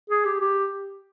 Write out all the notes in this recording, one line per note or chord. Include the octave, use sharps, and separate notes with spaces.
G#4
G4
G4